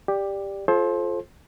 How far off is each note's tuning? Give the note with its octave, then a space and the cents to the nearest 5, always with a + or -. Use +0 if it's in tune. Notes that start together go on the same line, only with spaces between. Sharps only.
G4 +10 D5 +5
F4 +0 A4 -30 C5 +20